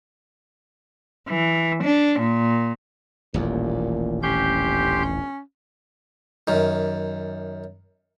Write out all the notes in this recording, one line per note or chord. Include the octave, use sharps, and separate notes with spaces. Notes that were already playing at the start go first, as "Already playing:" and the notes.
E3
D4
A#2
D#1 A1 D#2 A#2
G1 C#4 G4 C6 G6
F#2 D#3